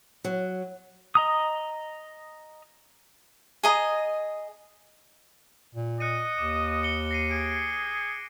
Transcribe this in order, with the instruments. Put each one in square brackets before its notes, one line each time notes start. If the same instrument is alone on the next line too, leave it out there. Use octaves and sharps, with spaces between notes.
[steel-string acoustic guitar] F#3
[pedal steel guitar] D#5 A#5 D#6
[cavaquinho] G#4 D#5 A#5
[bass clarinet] A#2
[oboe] D#5 [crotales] F#6 C#7 D#7
[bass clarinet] D#2 [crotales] D6
[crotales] C#7 G7
A#6 C7 D#7
[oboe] G#4 [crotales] D7